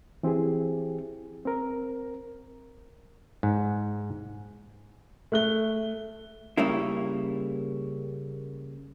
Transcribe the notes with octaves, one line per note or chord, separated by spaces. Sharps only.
E3 C4 E4 G4 G#4
C4 A#4
G#2
A3 F#6 G7
C#3 G3 A#3 E4